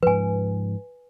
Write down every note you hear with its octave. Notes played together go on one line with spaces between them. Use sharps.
G#2 F3 B4 G#5